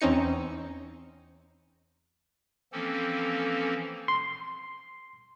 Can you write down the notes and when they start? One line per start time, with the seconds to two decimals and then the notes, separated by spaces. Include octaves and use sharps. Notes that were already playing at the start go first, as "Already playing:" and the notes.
0.01 E2 C4 C#4 D#4 C#7
2.72 E3 F3 A#3 C4 C#4 A4
4.08 C6